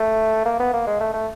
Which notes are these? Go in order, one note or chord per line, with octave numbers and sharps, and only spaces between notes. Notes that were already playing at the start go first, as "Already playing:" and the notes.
Already playing: A3
A#3
B3
A#3
G#3
A3
A3